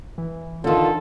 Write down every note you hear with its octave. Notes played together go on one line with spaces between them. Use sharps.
E3
D3 D#3 F4 A4